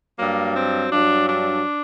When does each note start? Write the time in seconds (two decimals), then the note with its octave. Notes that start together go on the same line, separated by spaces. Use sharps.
0.17 G2 F#3 A#3
0.54 C4
0.91 G2 F#3 D4
1.28 D4